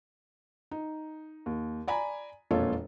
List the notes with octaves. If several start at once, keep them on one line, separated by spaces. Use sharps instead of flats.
D#4
D#2
D5 G#5 A#5 B5
E1 F2 A#2 F4 A4 C#5